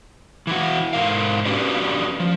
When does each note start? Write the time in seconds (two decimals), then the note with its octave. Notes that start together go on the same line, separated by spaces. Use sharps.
0.47 E3 E4 F#4
0.93 G#2 A#4 F5
1.46 C#4 D4 F#4 G4 B4 D5
2.20 F3